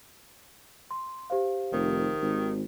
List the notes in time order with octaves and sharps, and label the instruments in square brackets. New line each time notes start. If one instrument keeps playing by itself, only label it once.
[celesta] C6
G4 C5 F5
[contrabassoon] F1 [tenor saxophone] D#3
[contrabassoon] G#1